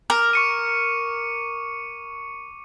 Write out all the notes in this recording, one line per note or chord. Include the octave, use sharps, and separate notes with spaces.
A#4 D6
C#6 C#7 D#7